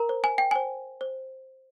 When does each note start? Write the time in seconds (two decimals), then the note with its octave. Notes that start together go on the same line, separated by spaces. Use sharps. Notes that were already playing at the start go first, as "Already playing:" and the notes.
Already playing: A#4 A#5
0.09 C5
0.24 G#5
0.38 G5
0.51 C5 G#5
1.01 C5